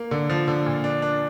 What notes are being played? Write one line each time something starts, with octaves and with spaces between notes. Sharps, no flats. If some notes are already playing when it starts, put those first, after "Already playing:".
Already playing: A#3
D3
F3
D3
A#2
D4
D4